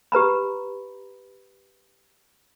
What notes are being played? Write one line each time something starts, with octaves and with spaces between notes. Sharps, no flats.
G4 B4 A#5 B5